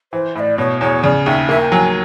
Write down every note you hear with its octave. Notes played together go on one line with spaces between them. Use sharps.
E3 C5
A2 D5 E5
B2 C#5
E2 C#5
C#3 D5
D#2 E5
A#3 E5
G5
F#3 G#5